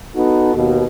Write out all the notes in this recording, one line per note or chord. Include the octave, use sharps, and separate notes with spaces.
B3 D#4 F#4 A4
D#2 B2